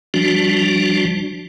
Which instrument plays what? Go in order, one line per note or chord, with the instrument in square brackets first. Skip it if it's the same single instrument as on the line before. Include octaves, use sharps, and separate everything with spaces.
[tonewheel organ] F3 G3 D4 F#4